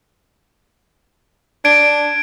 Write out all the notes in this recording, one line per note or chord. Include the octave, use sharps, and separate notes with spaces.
D4 G#6 D7